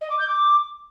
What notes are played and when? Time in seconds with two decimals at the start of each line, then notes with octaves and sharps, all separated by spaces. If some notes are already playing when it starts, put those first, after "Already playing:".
0.01 D#5
0.10 D6
0.19 G6
0.28 D6